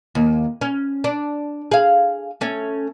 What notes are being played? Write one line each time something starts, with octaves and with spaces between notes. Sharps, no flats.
D#2
C#4
D4
G#4 F5
A3 C#4